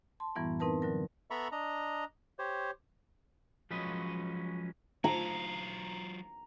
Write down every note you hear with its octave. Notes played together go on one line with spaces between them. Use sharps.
A5 C6
F#2 A2 E3 G3 B3 E4
C4 D#4 A#4 B4 A5
D3 F#3 A#4
B3 A4 E5 A#5 B5 C#6
D4 D#5 A#5
G4 C5 C#5
F3 F#3 G#3 C#4 B4 D#5
F#3 F4 A#5